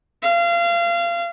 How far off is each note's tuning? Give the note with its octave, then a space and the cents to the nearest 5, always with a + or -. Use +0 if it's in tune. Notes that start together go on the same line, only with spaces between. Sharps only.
F5 -30